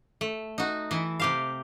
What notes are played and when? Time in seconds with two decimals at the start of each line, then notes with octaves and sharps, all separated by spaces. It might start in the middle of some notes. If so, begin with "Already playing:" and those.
0.21 A3
0.58 D#4 F#4
0.91 E3 E4
1.20 C3 G4 F5